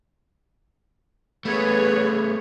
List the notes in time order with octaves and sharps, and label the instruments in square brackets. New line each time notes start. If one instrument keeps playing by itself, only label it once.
[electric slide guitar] A3 B3 [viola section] G#4 C#5 [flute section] B4 B5